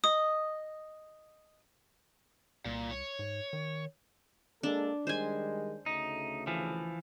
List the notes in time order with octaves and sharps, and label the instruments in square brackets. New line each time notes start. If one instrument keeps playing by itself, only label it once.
[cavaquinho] D#5 [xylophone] D#6
[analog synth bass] C2 [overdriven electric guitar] A#2
[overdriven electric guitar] C#5
[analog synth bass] G#2
D#3
[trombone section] G#3 A#3 A4 [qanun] D4
[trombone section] D#3 G3 G#3 [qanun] C5 G#5
[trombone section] D2 C#3 A3 [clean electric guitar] D#4
[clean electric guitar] E3 F3